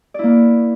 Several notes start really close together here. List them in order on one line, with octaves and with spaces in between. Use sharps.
D5 E4 A#3